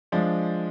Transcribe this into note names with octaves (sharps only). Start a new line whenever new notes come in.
F3 G#3 D4